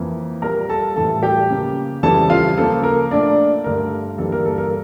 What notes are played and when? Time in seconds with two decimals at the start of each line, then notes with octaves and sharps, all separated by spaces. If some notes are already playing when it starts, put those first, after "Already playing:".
Already playing: F2 E3 A#3
0.42 A#2 G3 A#3 A#4 A#5
0.69 A4 A5
0.96 A2 E3 G3 A4 A5
1.23 G4 G5
1.50 C#3 F3 A#3
2.03 F2 C#3 E3 G3 A4 A5
2.30 F4 F5
2.58 C#3 F3 A#3 A4
2.83 A#4
3.11 A#2 A3 D4 D5
3.64 G2 D3 A3 A#4
4.18 G2 E3 G3 A#3 A4
4.32 A#4
4.45 A4
4.58 A#4